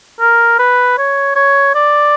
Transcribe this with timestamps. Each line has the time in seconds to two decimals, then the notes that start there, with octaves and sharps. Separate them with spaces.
0.21 A#4
0.59 B4
0.98 C#5
1.36 C#5
1.75 D5